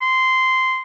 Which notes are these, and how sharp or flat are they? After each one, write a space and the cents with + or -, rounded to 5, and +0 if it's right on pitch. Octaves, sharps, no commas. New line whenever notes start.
C6 -10